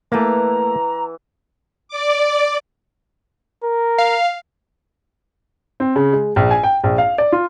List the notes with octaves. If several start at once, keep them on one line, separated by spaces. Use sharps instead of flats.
E3 A3 A#3 F#5 A#5 D6
D5 D6
A#4
F5
C4
C#3
G#3
A#1
G#5
G5
A#1
F5
D5
F4